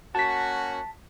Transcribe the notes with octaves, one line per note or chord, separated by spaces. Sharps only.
A#3 C#4 F#4 A5 B6